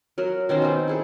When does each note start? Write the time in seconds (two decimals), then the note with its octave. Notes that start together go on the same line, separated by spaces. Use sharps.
0.18 F#3 A#4
0.49 B2 D#3 C#4 C5
0.62 C4 D#4
0.88 E4 G#4 A4